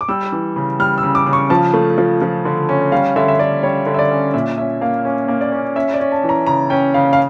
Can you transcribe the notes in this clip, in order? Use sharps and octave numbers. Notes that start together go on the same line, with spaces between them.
D6
G3 E6
E3
C#3
G3 F6
E6
C#3
D6
C#3
C#6
F3 A5
A3
F3
F3
D3
C#4
G3 F5
D3 E5
E5
D3 D5
G3 C#5
D3
E5
D5
C#4
A#2 E5
C#4 E5
A#3 F5
C#4
A#3
D5
C#4
C#4 E5
D5
C#4
A5
E3
A#5
C#3 A#5
C#4 G5
C#3 F5
F5